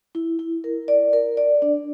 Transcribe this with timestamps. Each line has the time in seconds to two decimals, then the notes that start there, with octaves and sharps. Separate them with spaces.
0.15 E4
0.39 E4
0.64 A#4
0.88 D5
1.13 A#4
1.37 D5
1.62 D4